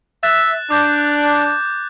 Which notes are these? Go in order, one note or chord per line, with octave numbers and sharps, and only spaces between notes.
E5 F#6 A6 E7
D4 D6 G6 E7